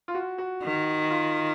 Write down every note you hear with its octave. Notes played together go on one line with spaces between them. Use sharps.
F4
F#4
F#4
D#3
F4